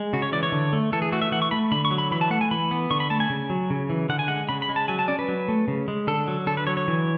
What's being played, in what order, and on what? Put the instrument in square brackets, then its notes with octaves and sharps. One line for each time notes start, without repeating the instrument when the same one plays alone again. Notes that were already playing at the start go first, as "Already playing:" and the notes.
Already playing: [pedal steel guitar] G#3
C#3 F#4
C#5
E3 D5
C#5
D3
A3
E3 A4
G#4
A3 F#4
E5
E3 F#5
C#6
A3 B5
D3 B5
C#6
F#3
B5
E3 B5
A5
A3 F#5
G#5
E3 B5
B3
D3 C#6
B5
A3 A5
G#5
C#3
F#3
C#3
E3
D3 F#5
G#5
G#3 F#5
C#3 B5
B5
G#3
A5
F#3 G#5
A5
C#4 D5
B4
F#3
A3
C#3
G#3
D3 A4
F#3
D3 A4
B4
F#3 C#5
C#5
E3